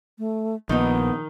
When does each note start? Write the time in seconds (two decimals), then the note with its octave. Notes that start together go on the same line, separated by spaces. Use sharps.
0.19 A3
0.69 A#1 D#3 B3 D#4